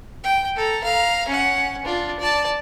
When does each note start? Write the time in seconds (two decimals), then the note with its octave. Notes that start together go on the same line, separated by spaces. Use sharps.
0.24 G5
0.56 A4 A#5
0.84 F5 A#5
1.28 C#4 F#5
1.84 D4 F4
2.20 D5 A5